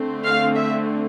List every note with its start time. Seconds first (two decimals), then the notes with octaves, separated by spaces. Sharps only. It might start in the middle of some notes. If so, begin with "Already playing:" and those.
Already playing: D3 A3 C4
0.24 F5
0.55 E5